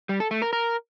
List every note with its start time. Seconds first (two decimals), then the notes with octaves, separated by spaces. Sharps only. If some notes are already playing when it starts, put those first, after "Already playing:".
0.09 G3
0.20 A4
0.31 A3
0.42 A#4
0.53 A#4